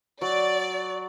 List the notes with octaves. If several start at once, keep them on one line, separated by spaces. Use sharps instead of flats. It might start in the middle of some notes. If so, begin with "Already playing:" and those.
F#3 D5